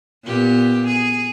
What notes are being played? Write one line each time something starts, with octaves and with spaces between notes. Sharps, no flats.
A#2 B3 G4
G#4